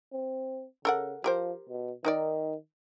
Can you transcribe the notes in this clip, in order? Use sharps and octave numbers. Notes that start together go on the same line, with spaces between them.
C4
C#3 A4 A#4 F#5
F3 G4 A#4 C5
B2
D#3 D#4 A#4 D5